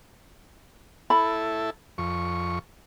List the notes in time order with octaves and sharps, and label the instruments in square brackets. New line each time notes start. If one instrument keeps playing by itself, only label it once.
[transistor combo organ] E4 A4 [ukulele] B5
[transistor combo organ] F2 C#6